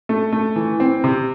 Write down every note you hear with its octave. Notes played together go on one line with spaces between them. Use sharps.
A3
A3
E3
C4
C3